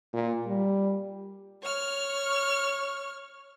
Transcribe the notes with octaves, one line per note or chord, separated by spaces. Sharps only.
A#2
G3
C#5 F6